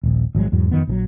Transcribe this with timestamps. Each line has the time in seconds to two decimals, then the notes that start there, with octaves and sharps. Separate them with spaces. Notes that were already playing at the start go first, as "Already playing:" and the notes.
0.03 D#1 A#1
0.35 G#1 F3 F#3 G#3
0.52 E2 G#2 F#3
0.71 F2 D#3 B3
0.87 A#1 D#3 F#3